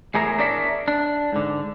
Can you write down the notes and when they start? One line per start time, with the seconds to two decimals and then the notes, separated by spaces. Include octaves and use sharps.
0.14 E2 A2 G#4 A#4 E5 A#5
0.39 D4 G#4 A#4 C#5 D5 E5
0.88 D4
1.32 G#2 D3